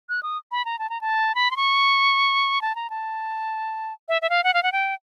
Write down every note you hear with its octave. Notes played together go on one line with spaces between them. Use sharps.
F#6
D#6
B5
A#5
A5
A#5
A5
B5
C6
C#6
A5
A#5
A5
E5
E5
F5
F#5
F5
F#5
G5